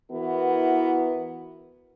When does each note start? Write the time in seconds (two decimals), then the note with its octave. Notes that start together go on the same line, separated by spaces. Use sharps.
0.11 E3 B3 E4 F#4 A#4 B4